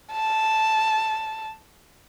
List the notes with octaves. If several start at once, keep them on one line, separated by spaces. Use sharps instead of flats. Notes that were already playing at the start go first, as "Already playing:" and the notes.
A5